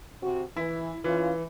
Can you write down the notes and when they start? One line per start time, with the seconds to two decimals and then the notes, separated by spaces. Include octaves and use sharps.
0.22 C3 C4 F#4
0.57 E3 E4
1.04 E3 C#4 E4 F4